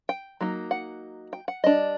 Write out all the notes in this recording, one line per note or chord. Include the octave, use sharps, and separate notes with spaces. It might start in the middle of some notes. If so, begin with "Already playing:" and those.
G5
F#3 A#3 D#4
F#5
G5
F#5
G3 D4 D#5